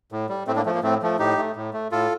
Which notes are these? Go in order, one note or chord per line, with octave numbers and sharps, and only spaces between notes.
A2
G3
A2 A3 C4
A#3 D4
F3 A3
A#3
A2 A3 C4
F3 A3
A2 D#4 G4
A3
A2
A3
A2 F4 A4